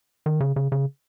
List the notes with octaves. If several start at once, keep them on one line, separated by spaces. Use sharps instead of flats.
D#3
C#3
C#3
C#3